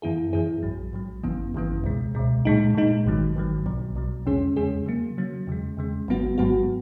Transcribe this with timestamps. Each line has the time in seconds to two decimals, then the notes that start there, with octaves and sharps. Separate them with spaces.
0.02 F#2 E3 B3 E4 G#4
0.33 F#2 E3 B3 E4 G#4
0.63 A#1 G#2 F#3
0.93 A#1 G#2 F#3
1.23 G#1 F#2 C#3 E3 B3
1.54 G#1 F#2 C#3 E3 B3
1.84 C#2 B2 G#3
2.15 C#2 B2 G#3
2.45 A#2 G#3 D#4
2.75 A#2 G#3 D#4
3.05 G#1 G#2 D#3 F#3
3.36 G#1 G#2 D#3 F#3
3.66 B1 B2 F#3
3.95 B1 B2 F#3
4.26 E2 C#3 G#3 C#4 G#4
4.56 E2 C#3 G#3 C#4 G#4
4.86 C#3 F#3 A#3
5.18 C#3 F#3 A#3
5.47 E2 C#3 G#3
5.77 E2 C#3 G#3
6.08 G#1 G#2 F#3 B3 F#4
6.38 G#1 G#2 F#3 B3 F#4